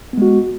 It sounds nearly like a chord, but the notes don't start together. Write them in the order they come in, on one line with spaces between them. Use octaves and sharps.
B3 G#3 F#4